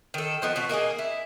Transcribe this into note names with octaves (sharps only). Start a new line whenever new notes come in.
D#3 A4
F3 B3 D#4
B2 F#4
A#3 D#4 F#4 G#4
E4